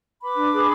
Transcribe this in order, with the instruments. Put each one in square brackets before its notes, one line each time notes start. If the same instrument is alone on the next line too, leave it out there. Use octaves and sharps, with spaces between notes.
[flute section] B4 B5 D6
D4
G#4